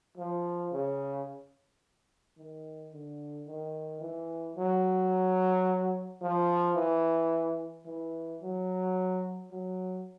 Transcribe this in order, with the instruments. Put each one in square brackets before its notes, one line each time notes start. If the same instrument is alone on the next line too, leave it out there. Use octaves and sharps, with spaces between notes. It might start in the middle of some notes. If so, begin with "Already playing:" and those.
[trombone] F3
C#3
D#3
D3
D#3
E3
F#3
F3
E3
E3
F#3
F#3